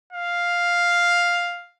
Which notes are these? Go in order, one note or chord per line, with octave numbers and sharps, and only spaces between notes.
F5